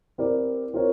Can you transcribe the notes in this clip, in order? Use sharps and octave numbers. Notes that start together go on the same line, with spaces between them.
C4 E4 G4 A#4 D5
C4 F4 A#4 C#5